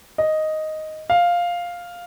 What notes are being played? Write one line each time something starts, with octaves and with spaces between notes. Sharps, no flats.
D#5
F5